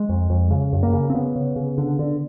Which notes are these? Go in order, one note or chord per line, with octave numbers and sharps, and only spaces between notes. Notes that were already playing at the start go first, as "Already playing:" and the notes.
Already playing: G#3
F2
F2
C#3
F#2
A#3
C#3
C4
C#3 B3
C#3
C#3
D3
D3